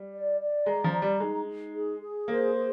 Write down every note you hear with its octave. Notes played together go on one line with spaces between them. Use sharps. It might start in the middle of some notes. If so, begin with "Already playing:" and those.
Already playing: G3
D5
D5
G#3 A#5
F3
A#5
G3
G#3 D#4
D#4
G#4
G#4
A#3 C5
G#4